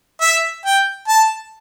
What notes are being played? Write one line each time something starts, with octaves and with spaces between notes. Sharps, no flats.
E5
G5
A5